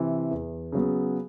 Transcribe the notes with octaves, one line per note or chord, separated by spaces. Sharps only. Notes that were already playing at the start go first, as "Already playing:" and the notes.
Already playing: C3 E3
E2
C#3 F#3 B3